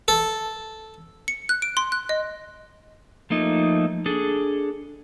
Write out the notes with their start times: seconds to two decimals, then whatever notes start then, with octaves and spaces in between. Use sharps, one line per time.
0.08 A4
1.28 C#7
1.49 F#6
1.62 D7
1.77 C6
1.92 F#6
2.09 D#5
3.30 F3 A3 A#3 D#4
4.06 D4 G#4 A4